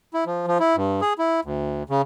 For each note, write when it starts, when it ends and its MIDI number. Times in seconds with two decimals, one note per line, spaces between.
0.14 0.24 64
0.26 0.46 53
0.47 0.58 53
0.60 0.76 64
0.76 1.01 43
1.01 1.13 68
1.18 1.40 64
1.45 1.83 38
1.90 2.02 49